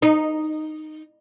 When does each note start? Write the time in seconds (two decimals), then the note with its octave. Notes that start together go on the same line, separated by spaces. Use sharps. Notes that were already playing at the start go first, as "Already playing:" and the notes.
0.02 D#4